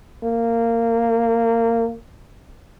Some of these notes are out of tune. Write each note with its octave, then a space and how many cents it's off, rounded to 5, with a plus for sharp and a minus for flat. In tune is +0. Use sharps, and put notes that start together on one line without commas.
A#3 -20